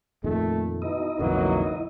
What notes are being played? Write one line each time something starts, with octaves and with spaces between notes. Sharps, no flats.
F2 A#2 D#3 A3
B2 D#4 E4 D#5
B1 F2 D3 E3 F#3 A#3